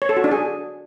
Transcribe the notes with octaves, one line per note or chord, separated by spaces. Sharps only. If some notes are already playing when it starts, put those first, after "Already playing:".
C#5
A4
F#4
D4
G#4